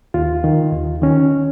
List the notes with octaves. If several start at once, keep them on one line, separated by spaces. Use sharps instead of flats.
D#2 F4
D#3
D#2
D#3 C#4